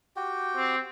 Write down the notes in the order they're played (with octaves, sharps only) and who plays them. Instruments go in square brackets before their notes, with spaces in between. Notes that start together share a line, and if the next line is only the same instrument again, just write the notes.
[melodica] F#4 G4 G5
[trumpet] C4